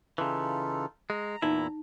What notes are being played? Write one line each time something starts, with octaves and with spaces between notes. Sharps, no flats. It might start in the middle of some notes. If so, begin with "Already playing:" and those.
C#3 E3 D#4 F4 A4
G#3 A#5
E2 A#2 D#4 E4